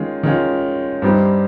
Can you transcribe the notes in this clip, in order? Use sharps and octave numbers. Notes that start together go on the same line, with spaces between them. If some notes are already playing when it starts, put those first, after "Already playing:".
Already playing: D#3 G#3 C#4 F4
D#3 G#3 C#4 F4
G2 G3 C4 D#4 G4